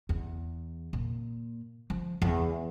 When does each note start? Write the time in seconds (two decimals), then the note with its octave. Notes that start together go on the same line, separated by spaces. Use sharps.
0.09 E2
0.93 A#2
1.90 F3
2.22 E2